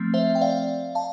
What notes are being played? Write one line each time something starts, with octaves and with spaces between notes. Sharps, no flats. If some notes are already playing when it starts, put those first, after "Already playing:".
Already playing: F3 A3 C4
C5 E5
G5
D5 F5
F5 A5